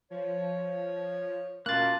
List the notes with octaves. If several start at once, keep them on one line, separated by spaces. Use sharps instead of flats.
F3 C#5
B2 A#3 C#4 F4 A#4 A5 F#6 A6